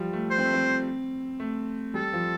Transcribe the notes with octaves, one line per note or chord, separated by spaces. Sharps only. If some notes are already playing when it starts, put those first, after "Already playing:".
Already playing: F3 G3
A3
C5
C4
A3
C4
A3
G3 A4
F3